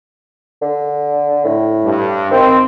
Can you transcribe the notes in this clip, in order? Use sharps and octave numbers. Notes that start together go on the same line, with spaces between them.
D3
A2
G2
D#3 C4